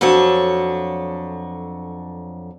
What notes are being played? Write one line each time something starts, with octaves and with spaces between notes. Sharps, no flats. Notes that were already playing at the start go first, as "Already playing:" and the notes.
F2 F#3 D4 A4 C#5